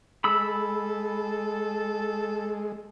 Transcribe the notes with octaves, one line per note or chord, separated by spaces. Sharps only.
G#3 A4 B5 E6